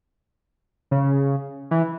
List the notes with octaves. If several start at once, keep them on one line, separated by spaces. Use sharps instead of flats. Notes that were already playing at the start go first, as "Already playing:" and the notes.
C#3
E3